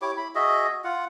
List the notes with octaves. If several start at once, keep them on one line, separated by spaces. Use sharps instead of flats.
E4 G4 C#5 D6
E4 B5
F#4 G#4 D#5 E5
F4 F#5